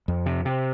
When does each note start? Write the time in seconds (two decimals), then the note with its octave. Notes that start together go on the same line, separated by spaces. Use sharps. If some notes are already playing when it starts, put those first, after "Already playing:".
0.08 F2
0.26 C3
0.45 C3